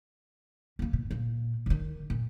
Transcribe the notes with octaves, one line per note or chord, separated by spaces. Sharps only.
D#2 A#3
B2
A#2
D3 D#3
A#2